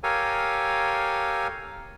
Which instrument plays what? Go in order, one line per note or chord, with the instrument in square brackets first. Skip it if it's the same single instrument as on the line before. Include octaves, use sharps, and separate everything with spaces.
[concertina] G4 A4 A#4 C#5 F5 G#5